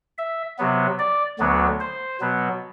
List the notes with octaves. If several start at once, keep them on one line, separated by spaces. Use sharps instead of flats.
E5
C3 F#3 B3
D5
D2 D3 F#3 B3
C5
B2 F#3 B3